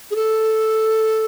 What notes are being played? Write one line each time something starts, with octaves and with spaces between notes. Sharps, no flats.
G#4
A4